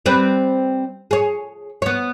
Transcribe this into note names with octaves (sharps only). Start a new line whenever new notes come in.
G3 C4 B4
G#4 C#5
B3 C#5